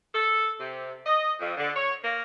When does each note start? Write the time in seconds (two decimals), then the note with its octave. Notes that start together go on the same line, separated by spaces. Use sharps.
0.15 A4
0.60 C3
1.06 D#5
1.40 F2
1.57 D3
1.76 C#5
2.03 A#3